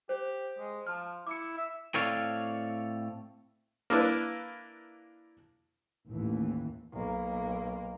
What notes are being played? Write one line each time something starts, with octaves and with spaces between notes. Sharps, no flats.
G4 C5
G#3
F3 A5 F6
E4 D6 C#7
E5
A2 C4 A4 C#5 D5 F5
A#3 D4 E4 B4
A1 D#2 A2 E3
B1 A#3